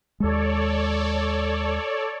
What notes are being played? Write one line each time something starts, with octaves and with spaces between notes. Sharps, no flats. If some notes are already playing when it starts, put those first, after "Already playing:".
D#2 G#3 A4 C#5 D5